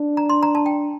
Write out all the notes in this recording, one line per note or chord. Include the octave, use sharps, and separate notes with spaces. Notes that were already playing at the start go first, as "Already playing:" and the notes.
Already playing: D4
A#5
C6
A#5
A5
G5